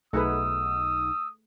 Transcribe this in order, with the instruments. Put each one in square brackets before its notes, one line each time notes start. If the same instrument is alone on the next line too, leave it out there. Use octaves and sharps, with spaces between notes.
[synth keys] B1 D#4 F#5 [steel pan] A3 G#4 B4 [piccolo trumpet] D#6 [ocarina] E6